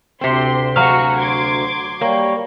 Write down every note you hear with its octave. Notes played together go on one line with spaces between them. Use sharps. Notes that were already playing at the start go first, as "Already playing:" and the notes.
D2 C3 C4 C6
F#3 F#4 G#4 F5 C#6
C6 D6 G#6
G3 A#3 C#5 G5